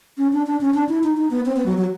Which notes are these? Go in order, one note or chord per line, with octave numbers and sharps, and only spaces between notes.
C#4
D4
D4
C#4
D4
E4
D#4
D#4
B3
C4
B3
F#3
F#3